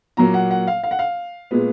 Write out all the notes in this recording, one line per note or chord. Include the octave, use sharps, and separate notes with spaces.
A#2 F#3 A#3 A#5
F#5
F#5
F5
F5
F#5
F5
A#2 G#3 B3